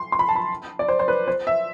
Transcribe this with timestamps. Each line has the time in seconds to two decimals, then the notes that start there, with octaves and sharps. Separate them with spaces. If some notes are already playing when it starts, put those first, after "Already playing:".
Already playing: C6
0.12 C6
0.19 B5
0.29 A5
0.35 B5
0.79 D5
0.88 C5
0.99 C5
1.08 B4
1.28 C5
1.47 E5